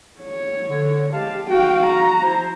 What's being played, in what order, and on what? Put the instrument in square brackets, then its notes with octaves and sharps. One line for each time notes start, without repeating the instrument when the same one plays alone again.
[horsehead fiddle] C#5
[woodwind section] D3
[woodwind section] G#3 F5 A5 [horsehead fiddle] G4
[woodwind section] F#4 [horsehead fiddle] F5 G5
[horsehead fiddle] A#5
[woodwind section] F3 E4 C5